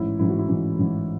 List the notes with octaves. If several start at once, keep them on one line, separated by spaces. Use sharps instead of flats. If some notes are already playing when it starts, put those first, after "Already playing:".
Already playing: A1 G#2 E3 E4
A1 G#2 E3 E4
F#4
E4
A1 G#2 E3
A1 G#2 E3